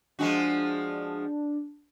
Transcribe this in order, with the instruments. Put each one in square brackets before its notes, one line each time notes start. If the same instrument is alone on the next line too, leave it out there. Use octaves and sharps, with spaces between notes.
[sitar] F3 G#3 F#4 [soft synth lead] D4